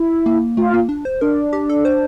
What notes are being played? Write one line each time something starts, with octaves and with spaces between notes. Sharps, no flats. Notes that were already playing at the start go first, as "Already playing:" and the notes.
Already playing: E4
A#3
A3 F4
A#3
D4
C5
D4 A#4
G4
A4
C5